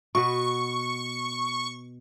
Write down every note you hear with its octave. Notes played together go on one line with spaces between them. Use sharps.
B2 F#4 B4 C#6